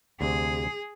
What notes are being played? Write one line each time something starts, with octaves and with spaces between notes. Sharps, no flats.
D2 C3 G#4